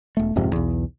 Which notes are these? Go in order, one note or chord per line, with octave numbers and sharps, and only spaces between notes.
E1 A3
D#1 F2 G#2 C3
B1 E2